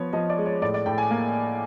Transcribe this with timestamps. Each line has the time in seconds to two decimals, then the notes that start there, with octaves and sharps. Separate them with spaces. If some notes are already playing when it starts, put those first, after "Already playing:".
Already playing: F3 B3 C#5
0.13 F3 D#5
0.30 D5
0.38 G#3
0.46 C#5
0.62 A2 D5
0.74 D5
0.86 A2 G5
0.98 G#5
1.11 A#3